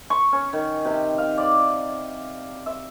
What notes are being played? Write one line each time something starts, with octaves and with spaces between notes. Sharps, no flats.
C#6
C#4
D#3
C3
F5
D5
E5